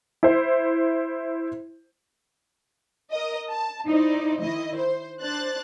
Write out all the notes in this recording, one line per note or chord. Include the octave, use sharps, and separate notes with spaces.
E4 C5
A#4 D#5
A5
D#4 E4 C5 D5
D#3 E4 D#5
C5
D4 C5 F#6 A6